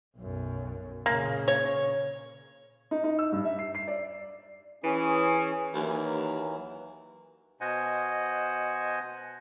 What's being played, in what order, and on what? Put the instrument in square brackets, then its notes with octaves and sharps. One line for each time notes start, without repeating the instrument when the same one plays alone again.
[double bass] B1 F#2
[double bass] A#2 C#3 [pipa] A#3
[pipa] C#5
[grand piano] D#4
D#4
E6
G2
E5
C7
C7
D5
[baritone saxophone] E3 [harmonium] C#4 G#4
[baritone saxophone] D#2 [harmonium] E3 F#3
[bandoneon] B2 C5 D#5 F#5 G#5